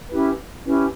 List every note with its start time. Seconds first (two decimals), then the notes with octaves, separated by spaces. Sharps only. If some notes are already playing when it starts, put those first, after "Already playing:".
0.11 C#4 E4 G4 B4
0.66 C#4 E4 G4 B4